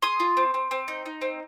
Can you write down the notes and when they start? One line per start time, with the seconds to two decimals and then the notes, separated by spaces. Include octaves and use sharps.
0.02 G#4 C6 D#6
0.20 F4
0.37 C4
0.54 C4
0.71 C4
0.88 D#4
1.06 D#4
1.22 C4